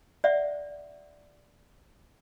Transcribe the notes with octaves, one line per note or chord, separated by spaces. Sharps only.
D5 E5 F#5